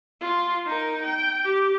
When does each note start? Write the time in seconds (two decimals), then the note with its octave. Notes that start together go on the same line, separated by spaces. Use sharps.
0.21 F4
0.67 D#4 A#4
1.03 G5
1.45 G4